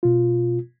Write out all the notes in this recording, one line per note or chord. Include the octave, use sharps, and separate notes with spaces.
B2 F4